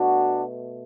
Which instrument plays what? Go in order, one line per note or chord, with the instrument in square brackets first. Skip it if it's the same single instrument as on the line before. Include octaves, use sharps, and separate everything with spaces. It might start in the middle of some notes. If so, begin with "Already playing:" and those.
Already playing: [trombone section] B2 A3 D4 F#4